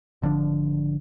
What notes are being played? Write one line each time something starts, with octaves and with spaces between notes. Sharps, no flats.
G#1 D3 F3 D4